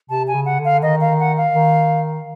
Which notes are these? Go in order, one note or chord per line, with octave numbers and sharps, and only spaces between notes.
C3 A5
G#5
C#3
F#5
D3
F5
D#3 D#5
F5
F#5
F5
D#3